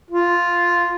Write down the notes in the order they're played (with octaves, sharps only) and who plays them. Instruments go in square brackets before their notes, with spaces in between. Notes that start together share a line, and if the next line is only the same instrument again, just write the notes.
[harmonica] F4